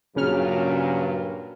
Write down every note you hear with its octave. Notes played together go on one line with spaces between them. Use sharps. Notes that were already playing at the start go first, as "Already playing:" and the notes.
G2 A#2 C#3 F#3 C#4 F6